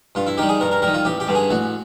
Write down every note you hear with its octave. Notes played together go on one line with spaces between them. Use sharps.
G2 F4
E4
D#3 G3 G4
G#4
G2 A#4
A#4
D#3 G3 A#4
F4
A1 G4
G4
G2 D3 G3
G#4
A1 F#4